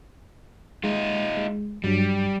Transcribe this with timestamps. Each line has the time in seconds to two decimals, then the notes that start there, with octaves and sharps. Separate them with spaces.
0.84 G#3 D#4 F4
1.37 G#3
1.84 G2 F#3 G3 D4